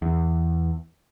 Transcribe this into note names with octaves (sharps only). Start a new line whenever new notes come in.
E2